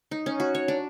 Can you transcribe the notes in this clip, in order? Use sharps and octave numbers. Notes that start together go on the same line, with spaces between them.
D#4
C#4
F#4
C#5
D4